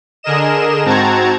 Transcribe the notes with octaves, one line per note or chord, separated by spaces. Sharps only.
D3 G#4 A#4 D#5 E7
G#2 C4 F#4 A5 A#5 G#6